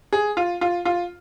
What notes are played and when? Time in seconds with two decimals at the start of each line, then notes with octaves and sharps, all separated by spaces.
0.13 G#4
0.37 F4
0.61 F4
0.85 F4